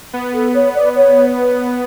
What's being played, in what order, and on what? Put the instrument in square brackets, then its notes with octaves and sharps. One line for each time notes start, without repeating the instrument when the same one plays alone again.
[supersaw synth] B3
[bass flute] A4
C#5
D5
C#5
B4